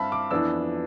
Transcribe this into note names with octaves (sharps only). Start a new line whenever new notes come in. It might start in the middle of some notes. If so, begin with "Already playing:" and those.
Already playing: G2 C4 E5 F5 A5 B5
D6
F2 E3 B3 D4 E6